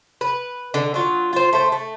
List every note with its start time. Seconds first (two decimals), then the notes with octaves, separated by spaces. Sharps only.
0.21 B4
0.74 D3
0.94 F#3 F4
1.33 F4 C5
1.53 A3 C5
1.72 A3